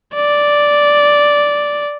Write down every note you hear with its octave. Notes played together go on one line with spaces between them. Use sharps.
D5